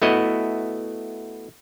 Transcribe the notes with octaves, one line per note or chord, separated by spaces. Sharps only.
A3 B3 E4 F#4 D#5